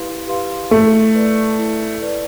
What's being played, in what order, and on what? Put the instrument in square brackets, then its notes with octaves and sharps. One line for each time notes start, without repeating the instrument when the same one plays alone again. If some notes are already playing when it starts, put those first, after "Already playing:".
Already playing: [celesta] E4 G4 B4 F5 C6
G4 B4 F5 C6
[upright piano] A3 [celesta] E4
[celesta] B4 D5
E4
B4 D5